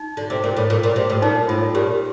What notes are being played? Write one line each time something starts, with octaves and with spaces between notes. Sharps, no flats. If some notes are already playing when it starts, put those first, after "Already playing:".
Already playing: D#4
D3
C3
A#2
A2
A#2
A#2
C3
A2
A#2 D#4
A2 F4
A#2 G4